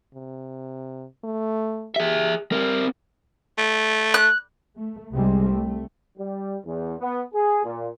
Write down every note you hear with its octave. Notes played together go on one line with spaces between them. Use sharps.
C3
A3
G4 G#4 E5
G3 C4 A#4
A3
F#6
A3
C2 C3 G3 G#3 C4
A3
G3
E2
B3
G#4
A#2